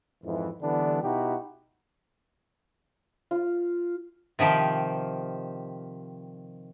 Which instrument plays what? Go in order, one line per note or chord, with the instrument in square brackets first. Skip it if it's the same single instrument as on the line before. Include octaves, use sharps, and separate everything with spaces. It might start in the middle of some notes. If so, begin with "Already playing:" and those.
[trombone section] F2 G#2 E3
D3 E3 G3 B3 D4
B2 D#4 E4 F#4 G4
[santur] F4
[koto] C3 D#3 F3 G4